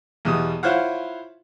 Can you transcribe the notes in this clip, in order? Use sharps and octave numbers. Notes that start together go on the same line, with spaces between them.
E2 B2 G3 D#6
E4 F4 C5 C#5 F5 F#5